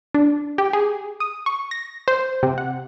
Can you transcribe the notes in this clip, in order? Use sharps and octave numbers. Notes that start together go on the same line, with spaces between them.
D4
G4
G#4
D#6
C#6
A#6
C5
C3
F#5